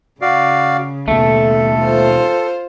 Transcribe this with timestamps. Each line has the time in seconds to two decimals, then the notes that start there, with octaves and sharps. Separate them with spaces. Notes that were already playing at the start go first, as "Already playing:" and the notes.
0.21 C#3 F#4 D5 F5
1.08 D#2 B2 A3 A4
1.82 F4 C5